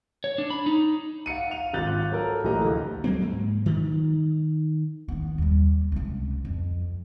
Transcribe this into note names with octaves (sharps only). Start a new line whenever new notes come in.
C#5
D4
B5
D#4
F5 F#5 C#7 D#7
F5 D#7 F7
G#1 F4 F#6 G6 A6
F#3 A4 A#4
A#1 E3 A3 G4 D#5 A#5
D2
F#3 A#3 C4
G#2
D#3
D#3 B3
D#2 G3
C#2 C3
F2